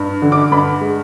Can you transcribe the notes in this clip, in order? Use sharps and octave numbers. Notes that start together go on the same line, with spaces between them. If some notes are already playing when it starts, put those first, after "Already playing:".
Already playing: G2
D3
D6
G2 B5
G#3